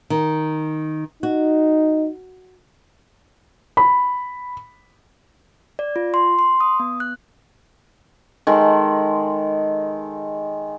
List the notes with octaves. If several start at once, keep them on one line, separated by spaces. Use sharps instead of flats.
D#3
D#4 F#4
B5
D5
F4
C6
C6
D#6
B3
F#6
D#3 G#3 A4